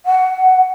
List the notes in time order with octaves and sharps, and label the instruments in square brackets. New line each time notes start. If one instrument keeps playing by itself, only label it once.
[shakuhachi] F#5